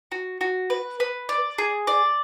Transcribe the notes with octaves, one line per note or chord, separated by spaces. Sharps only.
F#4
F#4
B4
B4
D5
G#4
D5